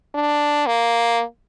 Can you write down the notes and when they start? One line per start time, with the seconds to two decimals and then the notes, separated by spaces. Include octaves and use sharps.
0.15 D4
0.67 A#3